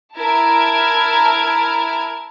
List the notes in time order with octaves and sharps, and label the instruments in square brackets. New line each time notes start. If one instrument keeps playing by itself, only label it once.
[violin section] E4 A#4 A5 F6 G#6 D7